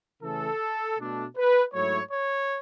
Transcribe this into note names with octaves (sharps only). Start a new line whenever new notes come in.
C#3 E3 A3 C#4 A4
B2 A3 D4
B4
G#2 F#3 A3 E4 C#5
C#5